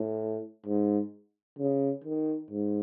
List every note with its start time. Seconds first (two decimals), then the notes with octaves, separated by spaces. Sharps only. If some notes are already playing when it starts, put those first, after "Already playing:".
Already playing: A2
0.66 G#2
1.59 C#3
2.04 D#3
2.51 G#2